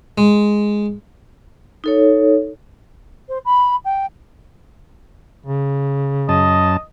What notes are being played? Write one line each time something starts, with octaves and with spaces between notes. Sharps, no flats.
G#3
D#4 A4 C#5
C5
B5
G5
C#3
F#2 D#5 A5